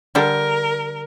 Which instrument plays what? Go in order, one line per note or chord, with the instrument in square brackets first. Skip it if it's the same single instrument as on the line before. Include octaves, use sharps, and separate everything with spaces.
[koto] D3 G3 A4 [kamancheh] A#4